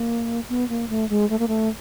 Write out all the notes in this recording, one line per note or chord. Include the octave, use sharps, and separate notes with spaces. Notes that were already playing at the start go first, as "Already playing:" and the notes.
Already playing: A#3
B3
A#3
A3
G#3
A3
A#3
A3